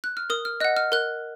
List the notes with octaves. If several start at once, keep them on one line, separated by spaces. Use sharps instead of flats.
F#6
F6
A#4 D#6
F6
D#5 F#5 F#6
F6
A#4 F#6